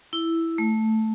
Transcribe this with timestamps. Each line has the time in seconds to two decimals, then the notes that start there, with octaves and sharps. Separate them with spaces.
0.13 E4
0.58 A3